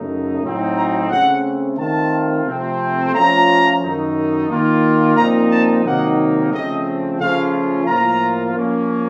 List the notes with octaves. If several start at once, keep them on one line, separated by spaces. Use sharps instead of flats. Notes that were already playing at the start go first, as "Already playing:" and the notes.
Already playing: F#2 C#3 A3 D#4
A2 F#3 C4 D#4
A#5
C#3 A3 C4 F#5
D#3 A3 C4 F4 A5
C3 F3 A3 C4
F3 A3 C#4 F4 A#5
F#2 D#3 A3 D#4
D#3 A#3 F4
A#2 F3 C4 D#4 A#5
A5
C3 D#3 F#3 A#3 D#4 F#5
C#3 F3 A3 C4 D#5
C#3 F3 A3 C#4 F4 F5
A2 F3 A#3 F4 A#5
F3 A#3 C#4